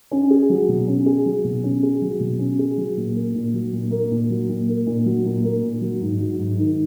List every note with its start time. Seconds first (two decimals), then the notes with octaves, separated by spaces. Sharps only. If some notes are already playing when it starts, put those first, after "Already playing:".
0.11 C#4
0.30 G#4
0.50 F#3
0.68 B2
0.88 C#4
1.06 G#4
1.26 F#3
1.44 B2
1.64 C#4
1.83 G#4
2.02 F#3
2.20 B2
2.39 C#4
2.59 G#4
2.77 F#3
2.97 A#2
3.15 A#3
3.35 A#2
3.54 F#3
3.73 A#2
3.91 A#3
4.11 A#2
4.30 F#3
4.49 A#2
4.68 A#3
4.86 A#2
5.05 F#3
5.25 A#2
5.44 A#3
5.63 A#2
5.81 F#3
6.01 G#2
6.20 F#3
6.39 G#2
6.58 D#3